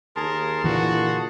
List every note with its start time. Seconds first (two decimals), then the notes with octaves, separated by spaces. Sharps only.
0.16 D#2 G#4 A#4 A5 C6
0.64 A#2 D3 E3 F#4